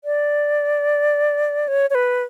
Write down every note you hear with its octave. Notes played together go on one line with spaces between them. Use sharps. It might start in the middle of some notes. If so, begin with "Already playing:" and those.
D5
C#5
C#5
B4